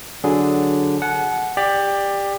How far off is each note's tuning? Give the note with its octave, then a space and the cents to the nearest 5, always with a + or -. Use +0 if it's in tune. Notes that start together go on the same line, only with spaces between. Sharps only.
D3 +0 F#3 +0 G#4 +0
F#5 +0 A5 -45
G4 +20 D5 +15